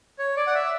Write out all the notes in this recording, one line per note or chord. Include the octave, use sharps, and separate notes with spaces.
C#5
D5
F#5
E5